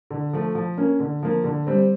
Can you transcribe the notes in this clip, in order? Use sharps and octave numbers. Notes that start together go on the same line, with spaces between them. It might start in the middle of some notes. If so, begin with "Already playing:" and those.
D3
F3 A3
F3
A#3 C#4
D3
F3 A#3
D3
G3 C4